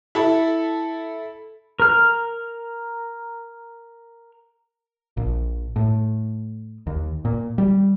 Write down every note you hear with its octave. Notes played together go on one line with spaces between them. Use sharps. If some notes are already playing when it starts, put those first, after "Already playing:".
E4 A4 B5
A#4 F6
A#1
A2
D#2
A#2
G3